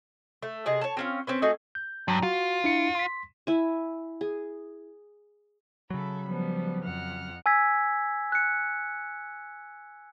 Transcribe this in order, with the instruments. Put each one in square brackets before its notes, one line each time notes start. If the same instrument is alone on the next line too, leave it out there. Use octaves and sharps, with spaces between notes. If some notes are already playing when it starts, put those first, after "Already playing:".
[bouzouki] A3
C3 G#4 D#5
C#5 A5
C4 C#4 F4
C4 C#4 B4
A3 D#4 F#4 G#4
[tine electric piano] G6
[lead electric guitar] G2 [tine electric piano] F#3 A#5
[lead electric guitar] F4 [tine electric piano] F#4
[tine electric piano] D4 E4 C#7
C6 B6
[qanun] E4 G#5
G#4
[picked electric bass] C#3 F#3 [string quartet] A4 E5 B5
[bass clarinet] F3 [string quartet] G3 B3
[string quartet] F2 F#5 F6
[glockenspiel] G#5 E6 G#6 B6
F#6 C#7